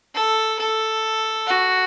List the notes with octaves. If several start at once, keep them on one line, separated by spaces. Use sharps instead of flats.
A4
A4
F#4